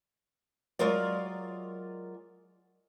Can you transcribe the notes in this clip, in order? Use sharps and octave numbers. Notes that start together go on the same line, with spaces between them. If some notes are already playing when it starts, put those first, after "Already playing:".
F#3 G#3 F4 A#4 D5